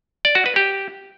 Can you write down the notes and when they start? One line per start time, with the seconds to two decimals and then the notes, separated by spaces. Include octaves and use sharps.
0.25 D5
0.35 F#4
0.46 B4
0.56 G4